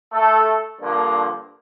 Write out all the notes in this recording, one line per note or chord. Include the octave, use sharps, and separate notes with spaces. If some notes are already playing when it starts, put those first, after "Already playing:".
A3 A4
G2 D3 F3 A#3